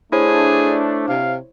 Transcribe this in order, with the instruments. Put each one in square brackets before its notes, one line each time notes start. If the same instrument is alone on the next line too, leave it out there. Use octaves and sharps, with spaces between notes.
[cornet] A3 [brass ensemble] D4 [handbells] E4 C5 C#5 [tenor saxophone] G#4
[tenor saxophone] C3 [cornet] F5